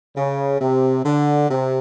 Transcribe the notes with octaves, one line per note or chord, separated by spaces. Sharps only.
C#3
C3
D3
C3